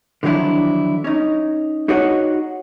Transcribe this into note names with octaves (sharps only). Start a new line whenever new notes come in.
D3 D#3 F3 F#3 D4 E4
C#4 D#4
D#4 F#4 G#4 C#5 D#5 F#5